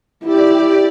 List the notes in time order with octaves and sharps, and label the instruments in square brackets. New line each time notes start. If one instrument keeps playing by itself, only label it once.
[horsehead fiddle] E4 [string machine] G4 D5